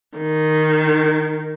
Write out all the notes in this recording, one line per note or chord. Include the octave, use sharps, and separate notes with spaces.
D#3